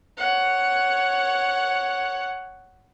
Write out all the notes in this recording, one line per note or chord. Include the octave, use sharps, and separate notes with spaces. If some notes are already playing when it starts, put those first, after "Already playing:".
C#5 F#5